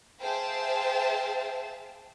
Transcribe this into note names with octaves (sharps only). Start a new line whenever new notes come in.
G#4 C5 E5 F5 G5 A5